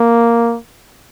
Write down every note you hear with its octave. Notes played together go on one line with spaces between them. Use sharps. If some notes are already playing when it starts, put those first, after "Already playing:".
Already playing: A#3